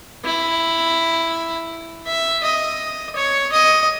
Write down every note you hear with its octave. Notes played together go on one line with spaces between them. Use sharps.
E4
E5
D#5
C#5
D#5